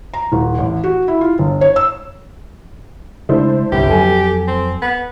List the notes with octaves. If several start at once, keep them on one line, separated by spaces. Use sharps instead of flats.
A#5
D#1
A1
F#4
E4
F4
G1
C#5
E6
C#3 G#3 A3 D4 E4 C5
G1 C2 G4
F2 F#3 A4 G#5
C4
B3